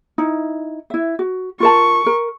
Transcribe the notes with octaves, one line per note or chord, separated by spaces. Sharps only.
D#4 E4
E4 E5
F#4
F4 A#4 A5 C#6
A#4